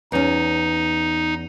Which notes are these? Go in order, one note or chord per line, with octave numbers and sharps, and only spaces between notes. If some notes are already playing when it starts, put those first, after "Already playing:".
E2 C#4 D#4